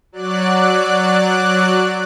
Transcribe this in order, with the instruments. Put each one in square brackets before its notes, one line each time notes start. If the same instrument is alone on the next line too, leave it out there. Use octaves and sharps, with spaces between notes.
[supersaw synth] F#3 D5 F#6